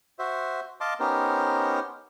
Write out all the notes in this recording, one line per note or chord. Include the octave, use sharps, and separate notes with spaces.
F#4 C5 E5
D#5 F5 A5 C6 D6
B3 C#4 D#4 G4 A#4 C5